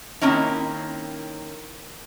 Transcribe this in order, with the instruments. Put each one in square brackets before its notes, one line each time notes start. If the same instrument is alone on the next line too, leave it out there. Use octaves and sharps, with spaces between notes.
[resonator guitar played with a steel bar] D#3 A#3 C4 C#4 E4